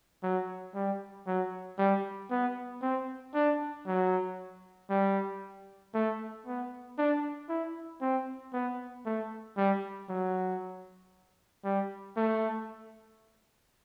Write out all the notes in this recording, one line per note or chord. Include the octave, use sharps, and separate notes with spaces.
F#3
G3
F#3
G3
B3
C4
D4
F#3
G3
A3
B3
D4
E4
C4
B3
A3
G3
F#3
G3
A3